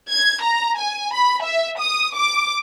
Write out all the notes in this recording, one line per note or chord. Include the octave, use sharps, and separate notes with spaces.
G#6
A#5
G#5
B5
E5
D#6
D6